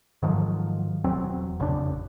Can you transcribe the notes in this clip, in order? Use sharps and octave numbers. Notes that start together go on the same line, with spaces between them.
G#2 D#3 F3 F#3
E1 E2 F#3 C4
A1 F2 C#3 D4